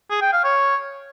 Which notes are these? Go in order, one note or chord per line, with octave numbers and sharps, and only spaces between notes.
G#4
G5
F5
C#5